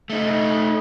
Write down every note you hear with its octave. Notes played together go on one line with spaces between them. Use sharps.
A3 D#4